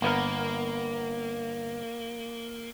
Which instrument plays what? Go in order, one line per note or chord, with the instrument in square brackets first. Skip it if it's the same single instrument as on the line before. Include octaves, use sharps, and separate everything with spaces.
[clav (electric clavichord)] G1 B3 A#4 [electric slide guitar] A#3